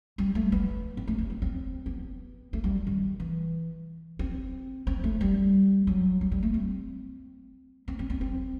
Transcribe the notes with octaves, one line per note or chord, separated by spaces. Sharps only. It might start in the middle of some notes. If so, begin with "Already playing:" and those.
G3
A3
B3
C4
A3
B3
C4
C4
B3
A3
G3
D#3
E3
C4
C4
A3
G3
F#3
G3
G3
A3
C4
C4
C4
C4
C4